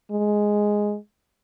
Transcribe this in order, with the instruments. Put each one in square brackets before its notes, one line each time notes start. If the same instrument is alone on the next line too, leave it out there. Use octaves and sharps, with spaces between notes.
[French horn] G#3